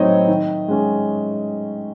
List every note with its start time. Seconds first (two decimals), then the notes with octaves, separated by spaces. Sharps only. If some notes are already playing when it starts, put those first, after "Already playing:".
Already playing: A2 F#3 C4 D#4 C#5 D#5
0.28 D#3
0.68 G#3 C#4